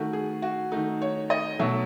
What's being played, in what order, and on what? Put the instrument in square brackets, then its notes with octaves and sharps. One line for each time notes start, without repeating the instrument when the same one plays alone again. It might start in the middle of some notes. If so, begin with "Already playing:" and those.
Already playing: [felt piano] D#3 A3 F#4
G#4
F#4
D#3 A3 D#4
C#5
D#5
B2 F#3 A3 E5